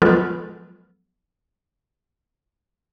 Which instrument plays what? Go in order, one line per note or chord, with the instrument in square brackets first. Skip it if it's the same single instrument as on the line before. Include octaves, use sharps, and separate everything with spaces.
[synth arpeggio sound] F3 F#3 G#3 B3 F4 A4